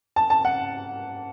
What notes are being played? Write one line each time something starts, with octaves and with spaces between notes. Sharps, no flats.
A5
A5
F#5